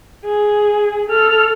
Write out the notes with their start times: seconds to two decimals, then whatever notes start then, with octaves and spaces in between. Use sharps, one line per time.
0.24 G#4
1.09 A4 F6